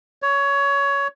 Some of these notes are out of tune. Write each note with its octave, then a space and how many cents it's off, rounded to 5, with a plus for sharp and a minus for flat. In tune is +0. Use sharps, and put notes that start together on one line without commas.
C#5 +20